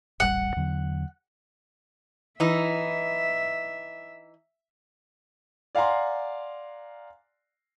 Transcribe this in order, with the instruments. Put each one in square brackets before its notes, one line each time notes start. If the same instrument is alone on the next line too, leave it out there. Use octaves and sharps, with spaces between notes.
[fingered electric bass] D#1 A1 G3 [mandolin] F#5
[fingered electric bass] E2 D3 F#3
[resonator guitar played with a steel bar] E3 D#4 [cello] E5
[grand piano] D5 F5 F#5 G#5 A#5 C6